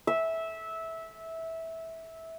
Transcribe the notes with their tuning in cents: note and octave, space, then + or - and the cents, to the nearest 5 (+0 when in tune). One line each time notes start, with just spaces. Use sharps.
E5 -15